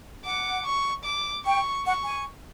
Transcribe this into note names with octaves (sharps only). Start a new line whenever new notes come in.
F#5 D6
C#6
D6
G5 C#6
F#5 C#6
G#5